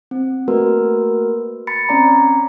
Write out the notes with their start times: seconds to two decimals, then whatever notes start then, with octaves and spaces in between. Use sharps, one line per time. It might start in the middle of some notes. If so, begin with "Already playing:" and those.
0.11 C4
0.48 A3 A#3 F#4 A#4 B4
1.67 B5 A6 C#7
1.89 C4 C#4 D5 A#5